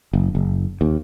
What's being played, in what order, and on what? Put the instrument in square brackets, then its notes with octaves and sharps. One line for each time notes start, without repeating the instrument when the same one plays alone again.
[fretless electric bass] F#1
F#1
D#2